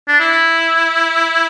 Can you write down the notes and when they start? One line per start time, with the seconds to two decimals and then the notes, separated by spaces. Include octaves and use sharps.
0.08 D4
0.20 E4